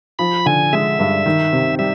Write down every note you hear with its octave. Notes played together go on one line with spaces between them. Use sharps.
F3 B5
D3 G#5
G#3 E5
G2
D#3
C3
G3 E5